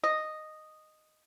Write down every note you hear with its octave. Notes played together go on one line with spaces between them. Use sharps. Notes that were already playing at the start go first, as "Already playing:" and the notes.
D#5